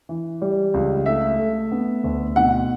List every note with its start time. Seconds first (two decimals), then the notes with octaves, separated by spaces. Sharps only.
0.09 E3
0.42 G3
0.74 C#2
1.06 A3 E5
1.39 A3
1.72 B3
2.04 D2
2.36 B2 F#5